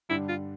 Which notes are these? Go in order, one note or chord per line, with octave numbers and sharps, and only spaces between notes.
G2 D3 G3 D4 E4
F4